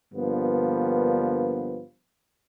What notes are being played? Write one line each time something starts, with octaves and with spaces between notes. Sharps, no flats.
G2 D3 F3 A#3 B3